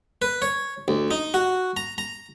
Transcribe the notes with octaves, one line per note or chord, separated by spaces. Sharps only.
B4
C#5
D2
D#4
F#4
A#5
A#5